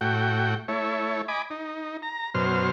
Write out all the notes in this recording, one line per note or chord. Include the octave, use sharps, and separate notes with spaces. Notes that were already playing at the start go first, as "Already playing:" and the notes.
A2 F#4 G5
A3 E4 C#5
D#5 G#5 B5 D6
D#4
A#5
F#2 B2 C5 F6